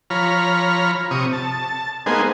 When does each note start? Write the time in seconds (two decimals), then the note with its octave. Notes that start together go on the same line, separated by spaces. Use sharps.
0.10 F3 C#5 A#5 B5 F6
1.11 C3 C#6 D#6
1.33 A5
2.06 G#3 A#3 B3 D#4 C5 G#5